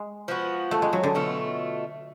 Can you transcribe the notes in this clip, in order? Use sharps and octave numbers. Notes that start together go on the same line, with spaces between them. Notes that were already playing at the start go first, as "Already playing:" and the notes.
Already playing: G#3
F3 B3 F#4
A3
G#3
F#3
D3
B2 A3 F4